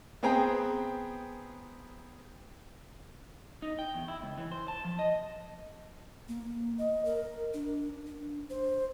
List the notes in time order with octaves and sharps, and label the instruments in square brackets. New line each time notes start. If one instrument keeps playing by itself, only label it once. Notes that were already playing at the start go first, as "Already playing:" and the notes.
[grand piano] B3 C4 G#4 G5 A#5
[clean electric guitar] D#4
G5
E2
E4
C#2
E3
C5
A5
F3
D#5
[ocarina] A#3
D#5
A#4
D4
D4
C5